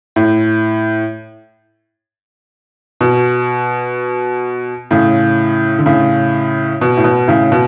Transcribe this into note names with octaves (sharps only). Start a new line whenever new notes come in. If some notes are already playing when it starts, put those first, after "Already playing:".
A2
B2
A2 C#3
D3
A2 C#3
B2
A2
B2
A2 C#3
B2